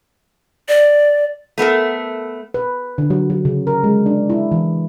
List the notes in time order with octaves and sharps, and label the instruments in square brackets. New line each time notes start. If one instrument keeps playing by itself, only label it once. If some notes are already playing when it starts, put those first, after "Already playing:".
[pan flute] D5
[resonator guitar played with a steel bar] A3 B3 A4 A#4
[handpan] B4
D3
F#3
F#3
C#3
A#4
G#3
D4
E4
E3